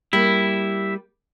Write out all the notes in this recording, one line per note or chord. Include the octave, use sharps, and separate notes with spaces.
G3 A#3 E4